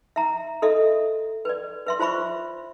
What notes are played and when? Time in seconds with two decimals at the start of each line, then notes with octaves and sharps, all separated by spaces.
0.16 E5 A#5
0.62 A4 D#5 E5
1.45 B4 D5
1.87 B4 E5 C6
1.99 F4 C5 E5 B5 C#6